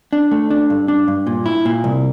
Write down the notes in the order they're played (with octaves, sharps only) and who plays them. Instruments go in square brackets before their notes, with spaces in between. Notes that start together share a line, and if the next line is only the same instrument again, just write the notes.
[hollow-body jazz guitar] D4
A3
D4
G2
D4
G2
A#2
E4
A#2
C2